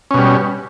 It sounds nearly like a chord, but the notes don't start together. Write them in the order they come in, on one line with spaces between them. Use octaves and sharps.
C#4 B2 G3